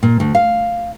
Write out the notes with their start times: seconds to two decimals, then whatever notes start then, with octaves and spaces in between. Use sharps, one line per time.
0.03 A#2
0.20 D2
0.35 F5